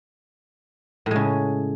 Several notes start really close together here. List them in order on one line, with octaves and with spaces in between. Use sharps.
A2 G#3 C#3